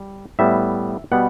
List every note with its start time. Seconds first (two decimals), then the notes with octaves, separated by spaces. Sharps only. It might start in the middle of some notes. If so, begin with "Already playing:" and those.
Already playing: G3
0.39 A2 G3 B3 E5
1.12 B2 G3 B3 F#5